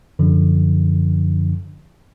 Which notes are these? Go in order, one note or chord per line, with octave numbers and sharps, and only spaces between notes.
F#2 D3 F3